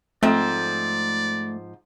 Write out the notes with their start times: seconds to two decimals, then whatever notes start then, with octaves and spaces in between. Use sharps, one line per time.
0.23 G#2 F3 A3 C4 D5